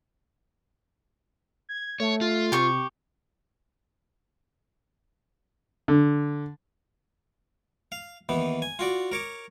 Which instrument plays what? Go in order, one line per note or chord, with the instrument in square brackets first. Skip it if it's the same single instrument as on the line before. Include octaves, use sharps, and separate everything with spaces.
[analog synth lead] G#6
[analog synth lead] A3 [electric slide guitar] C#5
[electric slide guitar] F4
[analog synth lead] C3 [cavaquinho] G4 C#6
[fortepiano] D3
[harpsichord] F5
D#2 E3 B3
G#5
F4 F#4 D5
A#4 C#5 D6